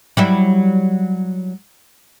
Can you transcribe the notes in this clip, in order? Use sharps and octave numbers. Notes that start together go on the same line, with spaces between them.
F#3 G3 E4